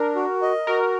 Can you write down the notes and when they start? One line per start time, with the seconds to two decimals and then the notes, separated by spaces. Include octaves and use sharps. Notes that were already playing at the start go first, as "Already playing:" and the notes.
Already playing: D4 A#4
0.15 F#4
0.42 D#5
0.67 F#4 A#4